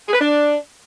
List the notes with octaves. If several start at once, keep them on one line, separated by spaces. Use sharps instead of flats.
G#4
B4
D4